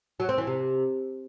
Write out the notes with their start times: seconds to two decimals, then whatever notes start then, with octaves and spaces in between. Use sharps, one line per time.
0.20 F#3
0.29 C4
0.38 E3
0.47 C3